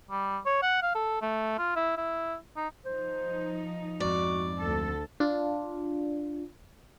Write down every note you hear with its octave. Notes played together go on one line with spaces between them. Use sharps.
G3
C#5
F#5
F5
A4
A3
F4
E4
E4
D#4
F3 D#4 C5
F2 G#2 F#4 D5
D2 A4 E6
D4 F4